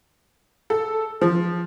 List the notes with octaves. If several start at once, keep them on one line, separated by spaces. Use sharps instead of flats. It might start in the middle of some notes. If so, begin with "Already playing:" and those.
A4
F3